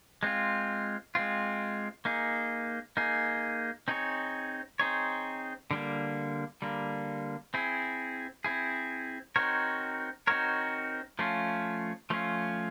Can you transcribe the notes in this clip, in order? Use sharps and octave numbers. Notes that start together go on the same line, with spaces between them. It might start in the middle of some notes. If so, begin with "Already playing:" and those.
G#3 C4 F4
G#3 C4 F4
A#3 D#4 G#4
A#3 D#4 G#4
C4 D#4 G#4 C#5
C4 D#4 G#4 C#5
D3 G3 A#3
D3 G3 A#3
C4 E4 G#4
C4 E4 G#4
C4 D#4 F#4 A#4 C#5
C4 D#4 F#4 A#4 C#5
F3 A3 C#4 F4
F3 A3 C#4 F4